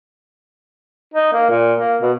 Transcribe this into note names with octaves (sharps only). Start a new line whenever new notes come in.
D#4
A#3
A#2
A#3
B2